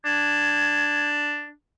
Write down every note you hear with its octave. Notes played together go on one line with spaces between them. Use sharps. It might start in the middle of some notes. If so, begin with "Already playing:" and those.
D4 G#6